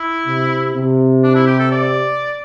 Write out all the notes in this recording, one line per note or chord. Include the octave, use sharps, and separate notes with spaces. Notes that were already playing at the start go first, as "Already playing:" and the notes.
Already playing: E4
C3
C3
D4
E4
G4
A4
D5